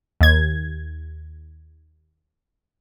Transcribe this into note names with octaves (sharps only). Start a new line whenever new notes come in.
D#2 G#6